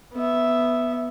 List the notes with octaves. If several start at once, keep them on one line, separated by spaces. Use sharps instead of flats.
B3 E5